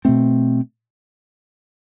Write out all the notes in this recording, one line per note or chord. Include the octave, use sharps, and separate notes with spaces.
B2 A3 C4